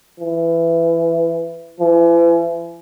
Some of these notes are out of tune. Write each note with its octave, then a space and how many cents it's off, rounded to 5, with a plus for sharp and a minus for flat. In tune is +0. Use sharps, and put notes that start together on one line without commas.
E3 +15
E3 +40